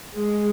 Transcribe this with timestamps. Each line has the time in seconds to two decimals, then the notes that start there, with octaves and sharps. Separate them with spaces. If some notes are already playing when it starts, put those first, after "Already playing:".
0.13 G#3